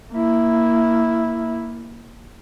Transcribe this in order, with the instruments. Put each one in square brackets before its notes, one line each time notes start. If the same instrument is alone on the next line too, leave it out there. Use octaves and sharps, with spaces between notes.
[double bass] A#3 E4